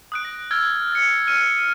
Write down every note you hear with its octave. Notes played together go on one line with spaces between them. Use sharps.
D#6 F#6 D7
A#6
E6 F6 G#6 A6 D7
A6 C#7
F6 D#7